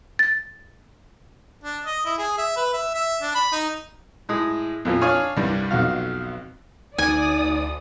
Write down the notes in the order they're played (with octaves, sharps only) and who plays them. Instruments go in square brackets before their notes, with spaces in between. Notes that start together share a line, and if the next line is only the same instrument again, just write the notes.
[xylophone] A6
[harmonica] D4
D#5
E4
G#4
E5
B4
E5
E5
D4
B5
D#4
[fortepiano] A2 G#3 D#6
F2 A#2 F3 F4
D4 C#5 F5 G#5 D#6
C2 G2 G3
B1 F2 F#4 F5
[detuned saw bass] D2 [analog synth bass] D#4 [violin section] D5 D#6 [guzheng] G#5